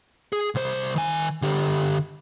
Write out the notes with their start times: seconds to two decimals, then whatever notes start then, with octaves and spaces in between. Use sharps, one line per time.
0.33 G#4
0.55 C2 C5
0.96 D#3 G#5
1.42 D3 G4